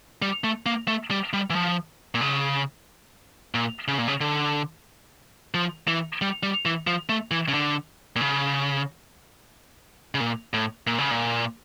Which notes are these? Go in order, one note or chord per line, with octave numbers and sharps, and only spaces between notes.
G3
A3
A#3
A3
G3
G3
E3
F3
A#2
C#3
A#2
C#3
A#2
C#3
D3
F3
E3
G3
G3
E3
F3
A3
E3
C#3
D3
A#2
C#3
C#3
A#2
A2
A#2
C#3
A#2